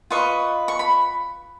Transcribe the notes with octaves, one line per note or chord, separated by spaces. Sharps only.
F4 B4 D#5 C#6
C#6
B5